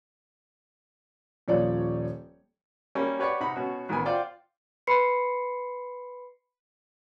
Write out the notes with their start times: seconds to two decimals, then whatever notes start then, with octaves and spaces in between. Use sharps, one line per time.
1.48 D#1 F3 C#5 D5
2.95 G3 A#3 C#4
3.19 G4 B4 C#5 D5 F#5 C#6
3.40 C3 D#4 F#5 B5
3.56 B2 C#4 F#4
3.89 A1 D#3 B3 G#5 B5
4.05 F4 C5 D5 F#5 G5
4.87 B4 B5 C6 C7 C#7